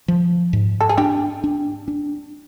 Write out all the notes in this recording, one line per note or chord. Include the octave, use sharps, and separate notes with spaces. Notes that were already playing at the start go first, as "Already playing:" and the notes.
F3
G#2
A4
G#4
D4 G4
D4
D4